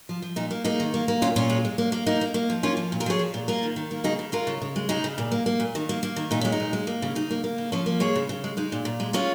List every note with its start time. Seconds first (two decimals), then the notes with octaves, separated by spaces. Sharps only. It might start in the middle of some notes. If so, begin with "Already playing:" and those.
0.09 F3
0.22 F3
0.36 A#2 D#4
0.51 A#3
0.64 A#3 D#4 G#4
0.80 D#3
0.94 A#3
1.08 A#3
1.22 A#2 C#4 F4
1.36 A#2 C#4 F4
1.50 G#3
1.65 G#3
1.78 A#3
1.92 A#3
2.06 A#3 D#4
2.21 A#3
2.34 A#3
2.50 F3
2.63 A#3 C#4 F4
2.77 F3
2.92 A#2
3.00 F4 A#4
3.06 F3 G#4 C#5
3.19 F3
3.34 A#2
3.48 A#3 F4 A#4
3.63 D#3
3.76 D#3
3.91 A#3
4.04 C#3 D#4 G#4
4.19 C#3
4.32 G#3 F4 A#4
4.47 C#3
4.62 C#3
4.76 G#3
4.89 C#3 D#4 G#4
5.04 C#3
5.18 A#2
5.32 A#3
5.46 A#3
5.60 A#2
5.75 D#3
5.89 A#3
6.03 A#3
6.16 D#3
6.31 A#2 D#4
6.41 G#3 C#4
6.52 D#4
6.60 A#2
6.73 G#3
6.87 A#3
7.02 C#3
7.15 C#3 D#4
7.31 A#3
7.44 A#3
7.58 C#3
7.72 F3 C#4
7.86 A#3
8.00 G#3 G#4 C#5
8.16 C#3
8.29 C#3
8.44 G#3
8.57 G#3 D#4
8.72 A#2
8.85 A#2
9.00 G#3
9.13 G#3 C#4 F4